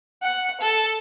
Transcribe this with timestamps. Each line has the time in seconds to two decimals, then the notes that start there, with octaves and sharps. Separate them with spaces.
0.23 F#5
0.61 A4